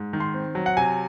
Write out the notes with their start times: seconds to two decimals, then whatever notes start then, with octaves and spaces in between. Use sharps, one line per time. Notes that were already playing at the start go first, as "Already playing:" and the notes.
Already playing: G#2
0.13 D#3
0.20 C6
0.34 C4
0.55 F#3
0.66 F#5
0.77 C3 G#5